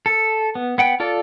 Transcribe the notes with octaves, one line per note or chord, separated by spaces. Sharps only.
A4
B3
B3 F#5 G5
F4 A4 D5